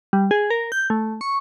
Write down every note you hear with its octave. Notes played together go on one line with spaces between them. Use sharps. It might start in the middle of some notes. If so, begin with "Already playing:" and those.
G3
G#4
A#4
G6
A3
C#6